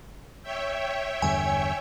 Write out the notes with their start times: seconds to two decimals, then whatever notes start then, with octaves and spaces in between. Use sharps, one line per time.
0.42 C#5 E5 G5
1.22 E2 G2 D3 G#5